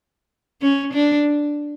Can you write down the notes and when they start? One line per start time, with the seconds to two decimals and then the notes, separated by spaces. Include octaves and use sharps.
0.61 C#4
0.94 D4